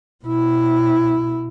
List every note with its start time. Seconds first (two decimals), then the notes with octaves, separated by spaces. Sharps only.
0.25 B2 E4